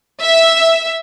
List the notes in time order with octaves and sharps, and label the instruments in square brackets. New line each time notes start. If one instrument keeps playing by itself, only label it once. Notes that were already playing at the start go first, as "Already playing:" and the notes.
[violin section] E5